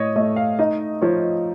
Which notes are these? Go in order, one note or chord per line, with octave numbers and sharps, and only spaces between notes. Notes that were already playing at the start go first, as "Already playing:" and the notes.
Already playing: A2 C#5 D#5
A3 D#5
F5
D#4 D#5
F3 C#5